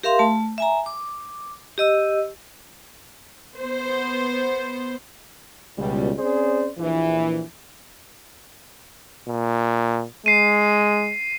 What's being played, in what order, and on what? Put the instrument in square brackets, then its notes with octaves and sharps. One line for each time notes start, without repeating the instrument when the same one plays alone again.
[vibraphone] G4 A#4 E5 F5 C6
A3 A5
E5 G#5 A#5
D6
G4 D#5 E6
[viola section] B3 C5
[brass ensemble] C#2 B2 G3
C4 C#4 G#4 C5 D5
A#1 E3
[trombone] A#2
[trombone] G#3 [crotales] C7 D#7